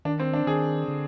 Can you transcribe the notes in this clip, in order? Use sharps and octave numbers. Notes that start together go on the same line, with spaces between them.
D#3 D4
C4
D4
D#3 G#4
D3